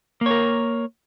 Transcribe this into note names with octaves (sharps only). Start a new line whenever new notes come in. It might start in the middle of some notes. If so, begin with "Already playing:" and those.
A#3 A#4 C#5